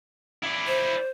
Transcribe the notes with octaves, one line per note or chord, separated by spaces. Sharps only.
E4 D5
C5